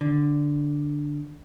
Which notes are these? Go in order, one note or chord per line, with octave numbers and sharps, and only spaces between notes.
D3